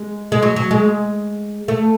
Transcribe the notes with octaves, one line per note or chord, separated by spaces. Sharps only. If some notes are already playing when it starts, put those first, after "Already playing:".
Already playing: G#3
G#3
F#3
F#3
G#3
A3